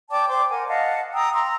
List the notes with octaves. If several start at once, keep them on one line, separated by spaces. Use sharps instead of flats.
D5 G5 A5 D6
C5 C6 D6
A#4 F#5 G#5
D#5 F5 F#5 A5
G5 A#5 D#6 E6
A#5 C6 E6